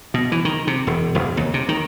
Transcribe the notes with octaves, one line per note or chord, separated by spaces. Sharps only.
B2
E3
D#3
C3
E1
E1
D#2
C3
D#3